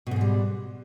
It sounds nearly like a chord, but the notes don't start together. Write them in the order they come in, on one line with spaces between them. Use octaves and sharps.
B2 G#2 G#3 G3